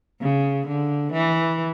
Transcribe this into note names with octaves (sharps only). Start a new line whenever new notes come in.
C#3
D3
E3